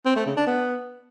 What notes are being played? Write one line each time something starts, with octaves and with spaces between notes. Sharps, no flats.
C4
A3
C#3
D4
B3